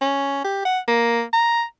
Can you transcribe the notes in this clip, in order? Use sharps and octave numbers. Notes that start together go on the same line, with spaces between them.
C#4
G4
F#5
A#3
A#5